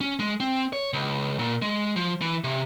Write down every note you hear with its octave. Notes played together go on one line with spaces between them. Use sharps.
C#4
G#3
C4
C#5
C#2
A#2
G#3
F3
E3
C3